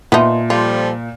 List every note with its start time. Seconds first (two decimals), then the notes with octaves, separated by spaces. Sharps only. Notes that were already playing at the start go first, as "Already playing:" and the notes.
0.12 A#2 B3 D#4 E5 A5 C6
0.50 F3 G3 F4 A4